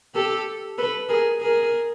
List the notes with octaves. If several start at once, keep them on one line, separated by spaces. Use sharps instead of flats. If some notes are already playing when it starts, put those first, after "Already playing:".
G4 A4
A4 B4
G#4 A#4
G#4 A#4